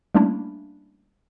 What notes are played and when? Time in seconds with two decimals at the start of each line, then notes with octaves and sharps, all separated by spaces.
0.15 G3 A3 A#3 C#4 D4 E4